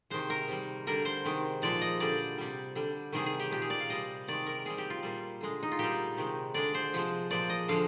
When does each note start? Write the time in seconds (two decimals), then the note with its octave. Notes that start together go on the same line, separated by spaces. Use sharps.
0.10 C3 D#3 G#3 C5
0.30 A#4
0.48 C3 G3
0.87 D3 G3 A#4
1.05 C5
1.25 C3 D#3 G#3
1.62 A#2 F3 G#3 D5
1.81 D#5
2.00 D3 G3 D5
2.38 C3 G3
2.75 D3 G3
3.13 C3 D#3 G3 G#4
3.26 G#4
3.40 G4
3.52 A#2 G#3 G4
3.62 G#4
3.70 D5
3.80 F5
3.89 C3 G3 D#5
4.28 C3 D#3 G#3 D5
4.46 A#4
4.65 C3 G3 G#4
4.78 G4
4.90 F4
5.03 A#2 G3
5.41 D3 G#3
5.63 D#4
5.72 F4
5.79 A#2 G3 G4
6.17 C3 D#3 G#3
6.54 D3 G#3 D5
6.75 C5
6.94 C3 F3 G#3
7.30 A#2 F3 G#3 D5
7.50 D#5
7.68 D3 F3 G#3 F5